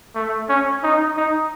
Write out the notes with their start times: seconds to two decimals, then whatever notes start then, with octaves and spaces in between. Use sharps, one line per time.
0.15 A3
0.49 C#4
0.83 D#4
1.17 D#4